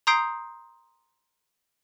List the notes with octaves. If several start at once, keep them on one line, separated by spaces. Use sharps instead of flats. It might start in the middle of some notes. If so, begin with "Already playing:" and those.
A#5 C6 D#6 G6 C7 D7